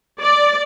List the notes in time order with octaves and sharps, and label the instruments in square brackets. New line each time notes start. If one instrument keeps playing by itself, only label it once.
[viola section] D5